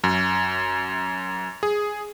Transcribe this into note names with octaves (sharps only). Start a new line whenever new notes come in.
F#2
G#4